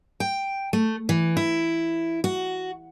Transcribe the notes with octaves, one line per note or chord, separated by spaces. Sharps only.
G5
A3
E3
E4
F#4